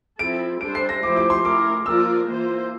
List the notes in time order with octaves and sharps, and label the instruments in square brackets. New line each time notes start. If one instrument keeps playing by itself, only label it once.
[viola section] F3 C4 E4 A4 [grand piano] D7
[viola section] G3 D4 A4 C5 [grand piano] D7
[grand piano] C7
A#6
[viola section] F3 A3 E4 G4 C5 [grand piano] D6
[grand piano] D6
C6
[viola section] A3 E4 A#4 [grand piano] D6
[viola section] F3 A#3 F4 A#4 D5 [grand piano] E6
[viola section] E3 A#3 F4 C5